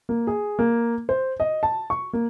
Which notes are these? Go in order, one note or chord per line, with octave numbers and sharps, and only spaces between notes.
A#3
G#4
A#3
C5
D#5
A5
C#6
A#3